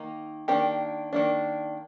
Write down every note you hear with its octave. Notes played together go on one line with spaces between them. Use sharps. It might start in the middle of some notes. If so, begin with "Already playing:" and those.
Already playing: D#3 A#3 D#4
D#3 A#3 D4 G4
D#3 A#3 D4